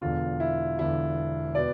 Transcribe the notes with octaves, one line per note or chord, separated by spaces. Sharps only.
E1 E2 D3 F4
E4
E1 E2 D3 E4
B2 B3 D5